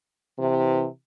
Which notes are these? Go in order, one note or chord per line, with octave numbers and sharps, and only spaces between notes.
C3 E3